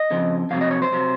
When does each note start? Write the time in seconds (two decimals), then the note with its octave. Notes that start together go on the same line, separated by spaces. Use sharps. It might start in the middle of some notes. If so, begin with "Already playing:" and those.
Already playing: D#5
0.11 F2 C#3 F3
0.51 F2 C3 F#3 F5
0.61 D#5
0.71 C#5
0.82 C5
0.92 C3 F#3